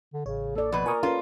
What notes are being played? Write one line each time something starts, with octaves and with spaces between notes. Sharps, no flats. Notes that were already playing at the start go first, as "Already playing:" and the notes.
D3
A1 C#3 C#5
A#3 A4 D5
B2 F3 B4
F4 A#4 G#5 C#6 D#6
C#4 F4 A4 B4